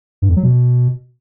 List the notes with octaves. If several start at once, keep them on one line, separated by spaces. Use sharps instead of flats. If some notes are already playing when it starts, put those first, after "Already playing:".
G2
F2
F#3
B2